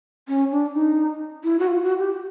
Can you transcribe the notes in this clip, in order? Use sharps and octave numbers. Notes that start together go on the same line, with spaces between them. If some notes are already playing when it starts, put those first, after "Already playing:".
C#4
D4
D#4
E4
F#4
F4
F#4
G4